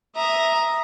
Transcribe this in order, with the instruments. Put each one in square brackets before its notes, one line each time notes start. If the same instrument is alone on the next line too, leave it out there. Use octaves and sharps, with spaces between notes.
[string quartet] E5 A#5 D#6